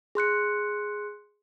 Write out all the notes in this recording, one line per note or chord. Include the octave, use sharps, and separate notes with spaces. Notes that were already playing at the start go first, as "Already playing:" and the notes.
G#4 C6 F#6 C#7